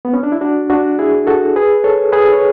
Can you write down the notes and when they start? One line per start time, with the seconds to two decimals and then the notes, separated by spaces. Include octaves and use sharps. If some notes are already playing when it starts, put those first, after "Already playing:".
0.05 B3
0.14 C#4
0.23 D4
0.32 E4
0.41 D4 F#4
0.70 D4 F#4
0.99 E4 G#4
1.27 F#4 A4
1.56 G#4 B4
1.84 A4 C#5
2.12 G#4 B4
2.32 C#5